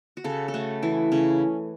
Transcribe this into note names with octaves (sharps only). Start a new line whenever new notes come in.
F#4
C#3 A4
A4
A3 F#4
E3 E4
C#3 C#4